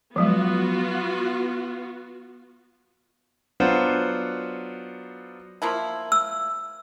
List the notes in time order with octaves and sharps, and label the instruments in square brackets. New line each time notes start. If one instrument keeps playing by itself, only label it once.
[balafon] F3 F#3 G#3 [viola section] B3 F4 F#4
[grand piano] F#3 B3 D4 F4 C5 F#5
[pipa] F3 A#3 E4
[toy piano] E6